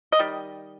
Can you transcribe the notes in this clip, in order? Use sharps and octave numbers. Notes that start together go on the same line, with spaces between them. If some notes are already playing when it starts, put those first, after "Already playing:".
D#5
D#3 G3